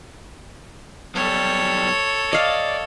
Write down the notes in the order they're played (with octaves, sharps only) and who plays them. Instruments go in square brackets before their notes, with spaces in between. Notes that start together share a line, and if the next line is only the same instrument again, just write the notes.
[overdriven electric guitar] B1 G3 [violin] A4 C#5
[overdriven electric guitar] D5 [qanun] D#5 F5